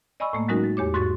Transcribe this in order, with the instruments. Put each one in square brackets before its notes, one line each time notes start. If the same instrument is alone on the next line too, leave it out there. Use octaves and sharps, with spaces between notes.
[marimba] D5 D#5 G#5 B5 C#6 E6
A2 A3 A#3
F#3 G#3 C#4 D#4 F#4 A#4
A6
E2 G4 C#5 D6
G#2 F#4 C6 C#6 A6